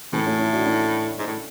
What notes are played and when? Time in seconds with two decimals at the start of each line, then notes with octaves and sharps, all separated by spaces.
0.13 A2 C#3 E3
0.26 A3 C#4
0.39 C#4 E4
0.53 D4 F#4
0.66 C#4 E4
1.19 G#2
1.27 A2